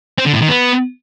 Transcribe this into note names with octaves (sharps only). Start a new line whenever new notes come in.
C4
D3
A2
D#3
B3